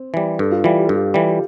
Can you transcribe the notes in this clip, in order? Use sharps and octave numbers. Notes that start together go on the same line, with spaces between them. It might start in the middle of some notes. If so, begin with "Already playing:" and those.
Already playing: C4
E3 G3
G2 A4
F4
E3 G3 F4
G4
A4
G2 G4
E3 G3
G4